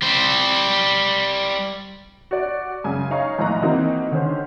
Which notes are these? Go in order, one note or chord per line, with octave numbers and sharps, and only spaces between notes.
G3 C5
F#4 D5
F#2 C#3 G#5
D#4 C#5 F5 A#5 C#6
A#1 A2 D#5 A#5 F#6
E3 A#3 C4 D#4 F#4
D3 D#3 C#4 C5